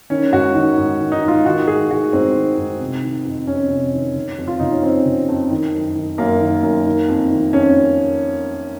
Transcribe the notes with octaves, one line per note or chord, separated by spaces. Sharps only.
D#3 C#4
G#2 F#4
D#3
G#2
D#3
D#4
G#2
F4
D#3 F#4
G#2 G#4
D#3 F#4
G#2 C4
D#3
G#2
C3
D#3
F2
F2 C#4
C3
D#3
C#3
F2
F4
C#3 D#4
C#4
F2 C4
C#3
F2
D#3
F#2
D#3
F#2 A#3
D#3
F#2
D#3
F2
D#3
F2 C#4